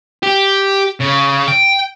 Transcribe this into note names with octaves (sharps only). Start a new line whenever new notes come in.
G4
C#3
G5